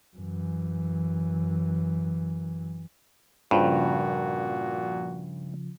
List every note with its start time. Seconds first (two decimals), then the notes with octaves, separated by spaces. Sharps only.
0.17 F#2 E3
3.51 G2 A#2 C#3 F3 A#3 F#4